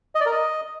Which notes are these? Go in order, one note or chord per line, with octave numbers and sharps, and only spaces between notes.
D#5
D5
A#4
D#5